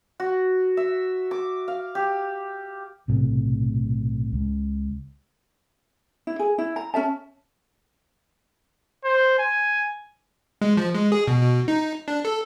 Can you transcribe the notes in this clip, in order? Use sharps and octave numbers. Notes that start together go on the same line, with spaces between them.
F#4
E5
D6
F5
G4
B1 A2 C3 A3
C#2
E4
G#4
E4
A#5
C#4 A4 E5 A5
C5
G#5
G#3
F3
G#3
G#4
B2
B2
D#4
D4
A4